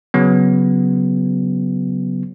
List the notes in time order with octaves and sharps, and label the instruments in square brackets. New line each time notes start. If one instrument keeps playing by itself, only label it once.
[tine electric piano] C#3 F#3 B3